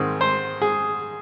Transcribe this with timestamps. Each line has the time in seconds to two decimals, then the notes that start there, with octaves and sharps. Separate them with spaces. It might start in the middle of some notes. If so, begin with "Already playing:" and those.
Already playing: G#2 D#3 G#3 C4
0.21 C5
0.62 G#4